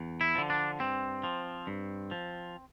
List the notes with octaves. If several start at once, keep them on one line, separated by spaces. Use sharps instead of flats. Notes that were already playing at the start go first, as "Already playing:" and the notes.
Already playing: E2
E4
D3 F3
D4
G2 C4
F3
G2
F3